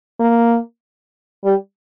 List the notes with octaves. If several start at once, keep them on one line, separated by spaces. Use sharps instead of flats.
A#3
G3